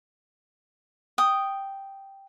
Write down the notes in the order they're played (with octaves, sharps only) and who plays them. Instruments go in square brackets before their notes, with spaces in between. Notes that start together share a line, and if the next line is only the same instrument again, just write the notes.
[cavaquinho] G5 D#6